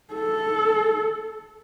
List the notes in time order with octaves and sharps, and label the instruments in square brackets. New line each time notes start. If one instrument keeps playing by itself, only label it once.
[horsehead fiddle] A4